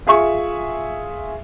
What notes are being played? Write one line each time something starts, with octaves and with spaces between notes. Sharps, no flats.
F4 G#4 E5 C#6